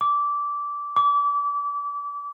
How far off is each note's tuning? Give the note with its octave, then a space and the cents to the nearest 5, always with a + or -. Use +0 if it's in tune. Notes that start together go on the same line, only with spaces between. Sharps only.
D6 -15
D6 -30